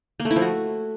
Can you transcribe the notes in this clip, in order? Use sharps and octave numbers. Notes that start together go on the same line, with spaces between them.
A#3
A3
E4
F3
F#4